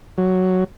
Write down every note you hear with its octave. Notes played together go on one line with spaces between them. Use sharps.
F#3